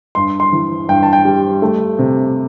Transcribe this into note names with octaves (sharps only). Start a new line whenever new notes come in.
G2 C6
C6
E3
G2 G5
A5
G5
G3
A3
C3